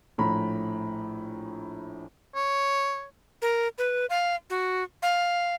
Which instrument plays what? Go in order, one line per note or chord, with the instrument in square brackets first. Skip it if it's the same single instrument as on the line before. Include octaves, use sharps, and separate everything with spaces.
[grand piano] A#1 A2 A#5 B5
[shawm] C#5
[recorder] A#4
B4
F5
F#4
F5